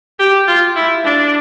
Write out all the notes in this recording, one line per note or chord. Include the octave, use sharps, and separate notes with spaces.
G4
F4
E4
D4